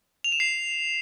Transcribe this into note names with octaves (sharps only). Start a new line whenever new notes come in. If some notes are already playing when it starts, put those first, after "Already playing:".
F7
E7
C7